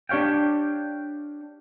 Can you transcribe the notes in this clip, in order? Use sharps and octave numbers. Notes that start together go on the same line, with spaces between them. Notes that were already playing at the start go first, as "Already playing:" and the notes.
D4 G4 C#5 F5 G5